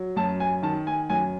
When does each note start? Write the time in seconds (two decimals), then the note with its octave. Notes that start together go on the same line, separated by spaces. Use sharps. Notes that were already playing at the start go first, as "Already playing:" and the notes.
Already playing: F#3
0.16 F#2 A5
0.40 G#5
0.63 D#3 A5
0.87 G#5
1.10 F#2 G#5